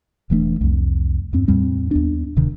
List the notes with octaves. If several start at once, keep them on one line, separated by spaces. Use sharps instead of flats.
E1 E3 A3 D4
C2 F2
E2 G2 C4
E2 A2 G3 C4
D#2 B3 D4
D1 C3 D#3